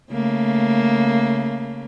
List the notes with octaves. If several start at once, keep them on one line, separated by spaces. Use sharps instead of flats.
C#3 A3 A#3